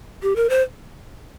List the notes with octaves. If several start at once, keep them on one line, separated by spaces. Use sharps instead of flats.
G4
A#4
C5